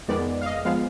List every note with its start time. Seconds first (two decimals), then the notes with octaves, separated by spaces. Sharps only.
0.08 F2 D#3 G#3 B3 D5
0.41 F5
0.46 D#5
0.65 F3 G#3 B3 F5